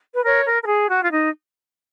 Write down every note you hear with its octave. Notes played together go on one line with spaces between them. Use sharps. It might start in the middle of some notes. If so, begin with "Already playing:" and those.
B4
A#4 C#5
A#4
A#4
G#4
F#4
F4
D#4